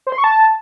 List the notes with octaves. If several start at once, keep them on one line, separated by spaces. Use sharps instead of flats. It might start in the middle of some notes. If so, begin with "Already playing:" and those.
C5
C6
C#6
A5